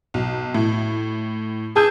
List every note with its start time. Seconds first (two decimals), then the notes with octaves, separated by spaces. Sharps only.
0.14 B1
0.54 A2
1.76 G#4 A5 E6 G6